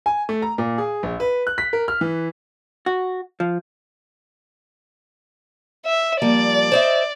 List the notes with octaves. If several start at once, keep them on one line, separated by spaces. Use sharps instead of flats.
G#5
A3
A#5
A#2
G#4
A#1
B4
F#6
B6
A#4
F6
E3
F#4
F3
E5
F3 G3 A#3 D5
C5 D#5 E5